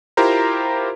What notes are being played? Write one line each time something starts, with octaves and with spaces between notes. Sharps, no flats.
E4 F4 G4 A#4 C5 A#5